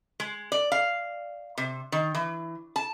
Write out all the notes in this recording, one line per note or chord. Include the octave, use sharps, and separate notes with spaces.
G#3
D5
F5
C3
D#3
E3
A5